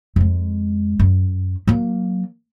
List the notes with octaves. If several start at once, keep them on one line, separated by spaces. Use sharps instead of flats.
F2 G#3
F#2
F#3 A#3